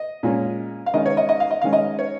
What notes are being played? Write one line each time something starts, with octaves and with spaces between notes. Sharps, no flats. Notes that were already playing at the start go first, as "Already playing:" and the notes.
Already playing: D#5
A#2 G#3 C#4
F5
D#3 G#3 C#4 D#5
C#5
D#5
D#5
F5
D#5
D#3 G#3 C#4 F5
D#5
C#5